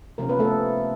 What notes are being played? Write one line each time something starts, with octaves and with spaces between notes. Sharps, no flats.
C3 F3 A#3 C#4 A#4
B3 B4
A3 A4